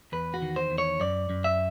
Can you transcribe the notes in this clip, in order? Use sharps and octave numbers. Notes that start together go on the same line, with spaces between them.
E2 B4
F#4
D#3
C5
E2
C#5
F#2 D5
F#2
E5